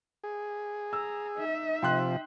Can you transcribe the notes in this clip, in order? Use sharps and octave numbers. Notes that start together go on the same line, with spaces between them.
G#4
A#5 E6
D#4 E5
C3 F3 G5 C6 F#6